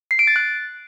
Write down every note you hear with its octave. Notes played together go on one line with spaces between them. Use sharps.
C7
D7
A6
F#6